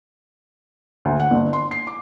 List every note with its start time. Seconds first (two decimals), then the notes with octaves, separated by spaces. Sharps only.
1.05 D2
1.20 F#5
1.31 G1
1.53 C6
1.71 C7
1.87 D6